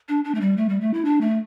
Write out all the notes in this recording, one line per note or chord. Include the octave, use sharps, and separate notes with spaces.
D4
D4
A3
G3
A3
G3
A3
E4
D4
A3